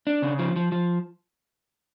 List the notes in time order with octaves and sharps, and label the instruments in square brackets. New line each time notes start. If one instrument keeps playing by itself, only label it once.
[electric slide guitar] D4
C#3
F3
F3
F3